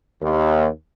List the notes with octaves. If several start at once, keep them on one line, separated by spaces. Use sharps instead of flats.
D#2